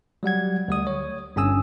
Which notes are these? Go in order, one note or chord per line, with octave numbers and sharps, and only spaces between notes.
F#3 G3 F#5 G#6
D2 G3 D#6
C#5
G1 G2 C#4 G#5 D#6 E6